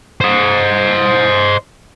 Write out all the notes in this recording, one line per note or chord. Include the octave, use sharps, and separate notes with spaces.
C5 D#5